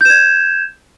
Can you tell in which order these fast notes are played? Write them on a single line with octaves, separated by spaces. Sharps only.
G6 E7 G#6